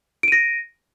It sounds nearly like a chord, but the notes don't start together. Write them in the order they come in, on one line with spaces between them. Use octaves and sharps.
D7 D#7 A#6